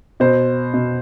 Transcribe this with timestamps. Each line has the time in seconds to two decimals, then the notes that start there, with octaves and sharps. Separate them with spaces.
0.20 B2 C5
0.74 B2